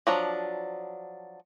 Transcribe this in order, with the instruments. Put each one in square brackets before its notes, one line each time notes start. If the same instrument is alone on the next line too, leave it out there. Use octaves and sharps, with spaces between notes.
[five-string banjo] F3 F#3 D4